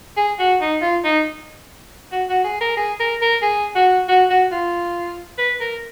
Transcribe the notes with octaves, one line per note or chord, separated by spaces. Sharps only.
G#4
F#4
D#4
F4
D#4
F#4
F#4
G#4
A#4
G#4
A#4
A#4
G#4
F#4
F#4
F#4
F4
B4
A#4